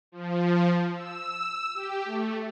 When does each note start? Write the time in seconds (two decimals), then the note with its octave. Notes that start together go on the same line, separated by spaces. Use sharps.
0.12 F3
0.94 E6
1.74 G4
2.05 A3